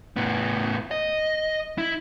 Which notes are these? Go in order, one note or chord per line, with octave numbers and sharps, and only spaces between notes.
A2 B3
D#5
E4